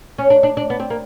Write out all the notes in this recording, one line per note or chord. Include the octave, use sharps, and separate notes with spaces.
C#4
D4
D4
D4
B3
C4
A#3